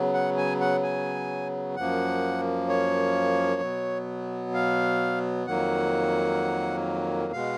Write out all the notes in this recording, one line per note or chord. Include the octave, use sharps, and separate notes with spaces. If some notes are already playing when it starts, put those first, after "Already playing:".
Already playing: C#3 F#3 B3
F#5
G#5
F#5
G#5
F#2 F3 A#3 F#5
C#5
B2 F#3 B3
F5
F2 D#3 F#3 A#3 F#5
B2 G#3 B3 F5